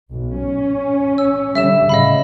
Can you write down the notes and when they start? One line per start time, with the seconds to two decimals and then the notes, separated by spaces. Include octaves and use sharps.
0.11 B1
0.40 C#4
1.18 E6
1.55 D3 G3 E5 E6 E7
1.89 A2 C#3 D#5 F5 B5